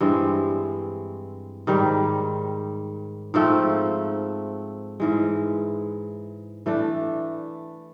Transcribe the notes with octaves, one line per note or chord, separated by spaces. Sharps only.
G2 E3 G#3 C4
G#2 D#3 G3
G#2 F3 A3 C4
G#2 E3 G#3
E3 A3 D4